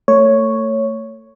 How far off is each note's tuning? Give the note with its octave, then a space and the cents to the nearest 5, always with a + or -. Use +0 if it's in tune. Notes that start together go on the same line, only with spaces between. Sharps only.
A3 +30 C#5 +0